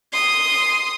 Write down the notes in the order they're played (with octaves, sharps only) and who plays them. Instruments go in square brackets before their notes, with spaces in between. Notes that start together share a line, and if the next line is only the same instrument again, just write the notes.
[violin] C6 D#6